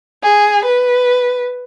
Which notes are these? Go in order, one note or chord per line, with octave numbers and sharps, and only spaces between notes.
G#4
B4